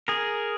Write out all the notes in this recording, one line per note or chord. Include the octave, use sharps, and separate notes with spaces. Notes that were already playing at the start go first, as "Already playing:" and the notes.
G#4 A#4